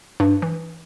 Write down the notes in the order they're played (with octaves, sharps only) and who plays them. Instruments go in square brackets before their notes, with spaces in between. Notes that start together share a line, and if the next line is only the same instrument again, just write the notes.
[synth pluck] G2
E3